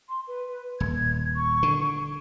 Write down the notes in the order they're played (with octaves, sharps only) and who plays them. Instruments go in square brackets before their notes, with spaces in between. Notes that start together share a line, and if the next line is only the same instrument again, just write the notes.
[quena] C6
B4
[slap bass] D#1 [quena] G#6
[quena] C#6
[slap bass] D3